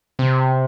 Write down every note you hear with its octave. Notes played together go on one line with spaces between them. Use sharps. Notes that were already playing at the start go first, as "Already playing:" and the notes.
C3